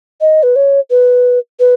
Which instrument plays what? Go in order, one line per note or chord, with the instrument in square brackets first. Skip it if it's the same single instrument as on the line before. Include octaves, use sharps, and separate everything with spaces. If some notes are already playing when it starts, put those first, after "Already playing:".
[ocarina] D#5
B4
C#5
B4
B4